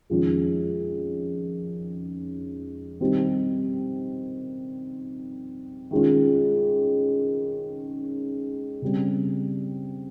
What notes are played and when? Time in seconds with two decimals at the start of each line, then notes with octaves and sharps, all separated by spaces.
0.10 F2 D#3 G#3 C#4 F4
3.00 D#3 G3 C4 D#4 G4
5.91 D#3 G#3 C#4 F4
8.82 C#3 G3 C4